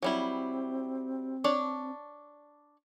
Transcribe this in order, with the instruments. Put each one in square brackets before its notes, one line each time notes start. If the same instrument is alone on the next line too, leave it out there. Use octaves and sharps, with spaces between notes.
[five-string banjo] F#3 G3 E4 [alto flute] C4
[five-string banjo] D4 C#5 D5